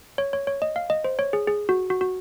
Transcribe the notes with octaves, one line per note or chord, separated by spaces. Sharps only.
C#5
C#5
C#5
D#5
F5
D#5
C5
C#5
G#4
G#4
F#4
F#4
F#4